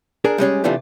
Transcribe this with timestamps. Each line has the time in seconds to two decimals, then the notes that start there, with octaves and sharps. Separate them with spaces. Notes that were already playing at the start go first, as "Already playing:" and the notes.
0.24 D4 G#4 A#4
0.38 G3 G#3 C#4 G#4
0.64 C3 E3 A3 D4 F4 G4